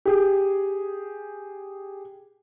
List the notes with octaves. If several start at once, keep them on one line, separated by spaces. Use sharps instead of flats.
G4 G#4